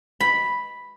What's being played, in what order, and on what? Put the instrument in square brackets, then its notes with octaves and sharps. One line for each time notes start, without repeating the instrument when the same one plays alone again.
[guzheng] B5